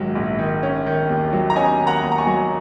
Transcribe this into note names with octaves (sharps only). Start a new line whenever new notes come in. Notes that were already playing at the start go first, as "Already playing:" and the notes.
Already playing: A#1 G#2 D#3 F#3
A#1
D#3
C#4
D#3
D#2
F#3
A#5
C#4 D#5 G#5
D#3
F#5 A#5
D#2
A#5
G#5 C#6
F#3